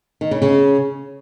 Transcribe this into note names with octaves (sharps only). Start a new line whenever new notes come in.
D#3
C#3
C#3